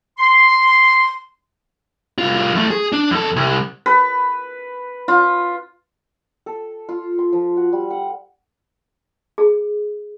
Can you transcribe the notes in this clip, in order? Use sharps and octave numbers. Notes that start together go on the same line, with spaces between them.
C6
C2 F4
E2 A3
G#4
D4
E2 A4
C2
B4
F4
A4
F4
C6
F3
F#4
G3
F#5
G#4